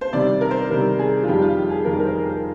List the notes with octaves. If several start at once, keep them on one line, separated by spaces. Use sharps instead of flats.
C5
C3 D#3 G3 D5
A#4
C5
C3 D#3 G3 A#4
G#4
F4
F2 D#3 G3 G4
F4
G4
G#4
F2 D#3 G3 A#4
A#4
C5
A#4